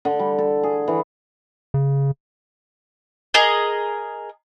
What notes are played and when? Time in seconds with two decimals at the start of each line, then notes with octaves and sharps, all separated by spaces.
0.05 D3
0.19 G3
0.38 A4
0.63 G#4
0.88 E3
1.74 C#3
3.34 G#4 A#4 D#5